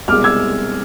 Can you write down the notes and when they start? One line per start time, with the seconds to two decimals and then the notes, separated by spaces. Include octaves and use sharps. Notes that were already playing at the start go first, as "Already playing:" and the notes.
0.08 C2 B2 G#3 D6 F6
0.24 E6 G#6